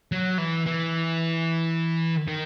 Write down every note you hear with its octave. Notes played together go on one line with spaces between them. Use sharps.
F#3
E3
E3
D#3